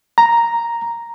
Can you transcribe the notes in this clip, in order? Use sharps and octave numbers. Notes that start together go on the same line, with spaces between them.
A#5